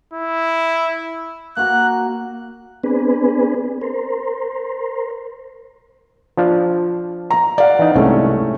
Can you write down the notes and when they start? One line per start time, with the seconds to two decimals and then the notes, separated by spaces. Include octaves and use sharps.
0.14 E4
1.57 A#3 F#4 A#4 F#6
2.84 B3 C4 D4 G#4 B4
3.81 A#4 C5
6.37 F3 D4 F4
7.31 A#5
7.58 D5 F5 F#5
7.79 E3 D#4
7.96 C2 G#2 A3 C#4